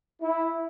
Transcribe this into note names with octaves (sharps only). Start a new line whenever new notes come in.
E4